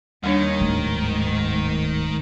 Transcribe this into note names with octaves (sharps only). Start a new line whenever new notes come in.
D#2 D#3 G3 D4 C#5
D1 G#2 A3